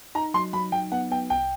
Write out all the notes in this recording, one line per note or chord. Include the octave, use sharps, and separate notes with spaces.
D#4 A#5
F#3 C6
F#3 B5
F#3 G5
B3 F#5
B3 G5
C2 G5